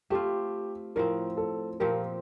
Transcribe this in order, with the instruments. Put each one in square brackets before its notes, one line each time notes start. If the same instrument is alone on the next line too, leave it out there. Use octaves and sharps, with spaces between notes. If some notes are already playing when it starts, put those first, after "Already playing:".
[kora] A3 C4 F4 [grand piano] G4
[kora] A2 F3 C4 [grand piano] A#4
[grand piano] A4
[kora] A#2 F3 C4 G4 [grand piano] A#4